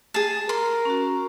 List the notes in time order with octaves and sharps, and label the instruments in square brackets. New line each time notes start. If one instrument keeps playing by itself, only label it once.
[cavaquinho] G#4 A5
[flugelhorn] A#4 [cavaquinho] C6
[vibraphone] C#4 F#4